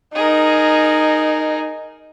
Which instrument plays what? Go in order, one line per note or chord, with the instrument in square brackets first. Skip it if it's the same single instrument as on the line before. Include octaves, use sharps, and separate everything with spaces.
[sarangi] D#4 [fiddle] G#4 A#4